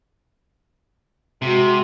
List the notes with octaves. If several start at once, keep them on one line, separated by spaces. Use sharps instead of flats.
C3 G#3 F#4